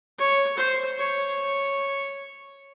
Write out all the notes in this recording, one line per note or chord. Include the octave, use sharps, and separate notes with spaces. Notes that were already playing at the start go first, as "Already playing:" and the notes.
C#5
C5
C#5